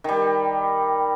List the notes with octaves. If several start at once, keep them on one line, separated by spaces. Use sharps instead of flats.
D#3 G3